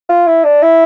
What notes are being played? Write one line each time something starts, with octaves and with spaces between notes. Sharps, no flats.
F4
E4
D4
E4